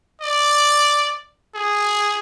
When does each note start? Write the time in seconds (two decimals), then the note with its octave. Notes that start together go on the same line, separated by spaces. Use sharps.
0.21 D5
1.55 G#4